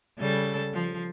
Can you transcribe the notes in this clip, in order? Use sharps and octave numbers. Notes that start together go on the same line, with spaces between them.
C#3 G3 A4
F3